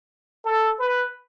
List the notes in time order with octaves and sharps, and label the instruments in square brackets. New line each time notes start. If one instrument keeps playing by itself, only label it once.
[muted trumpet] A4
B4